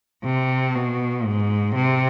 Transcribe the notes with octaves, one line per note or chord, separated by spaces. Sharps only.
C3
B2
G#2
C3